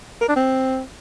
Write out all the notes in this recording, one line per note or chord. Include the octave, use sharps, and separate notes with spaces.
A#4
D4
C4